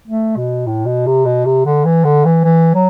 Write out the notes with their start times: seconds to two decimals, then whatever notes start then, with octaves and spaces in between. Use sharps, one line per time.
0.08 A3
0.36 B2
0.67 A2
0.86 B2
1.06 C3
1.25 B2
1.45 C3
1.65 D3
1.85 E3
2.04 D3
2.25 E3
2.44 E3
2.74 F#3